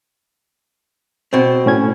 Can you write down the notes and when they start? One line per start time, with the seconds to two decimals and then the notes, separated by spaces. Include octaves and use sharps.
1.33 B2 C4
1.66 A2 C#4 G#6